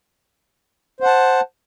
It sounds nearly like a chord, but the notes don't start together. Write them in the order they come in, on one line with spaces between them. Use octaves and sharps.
C5 F#5 A5